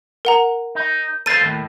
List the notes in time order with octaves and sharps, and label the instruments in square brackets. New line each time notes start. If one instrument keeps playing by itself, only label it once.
[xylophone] A#4 F#5 A#5
[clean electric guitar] D#4
[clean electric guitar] A4 C5 F5 [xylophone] A6 D#7
[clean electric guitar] D#2 A2